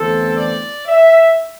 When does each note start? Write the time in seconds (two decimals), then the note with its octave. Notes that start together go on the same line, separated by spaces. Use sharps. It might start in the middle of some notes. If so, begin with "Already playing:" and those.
Already playing: E2 D3 A3 C4 A4
0.37 D5
0.87 E5